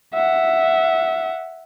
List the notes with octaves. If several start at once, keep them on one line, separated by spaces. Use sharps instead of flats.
E5 F#5